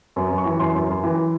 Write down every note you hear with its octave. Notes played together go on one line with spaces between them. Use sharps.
F#2
F#2
C#6
E3
F#2 C6
F#2
F#2
E3